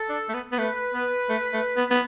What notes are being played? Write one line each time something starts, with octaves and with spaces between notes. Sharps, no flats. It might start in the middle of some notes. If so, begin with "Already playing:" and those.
Already playing: A4
D4
A3
B3
B3
A3 B4
B3
A3
A3
B3
B3